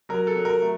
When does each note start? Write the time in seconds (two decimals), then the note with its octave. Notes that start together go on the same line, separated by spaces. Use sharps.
0.09 F#3 A#4
0.27 A4
0.36 F#3
0.45 A#4
0.62 A3